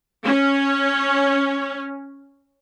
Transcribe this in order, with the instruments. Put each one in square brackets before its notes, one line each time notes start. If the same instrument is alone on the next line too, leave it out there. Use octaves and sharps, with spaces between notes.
[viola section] C#4